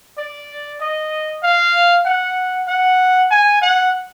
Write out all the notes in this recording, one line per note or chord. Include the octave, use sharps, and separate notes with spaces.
D5
D#5
F5
F#5
F#5
G#5
F#5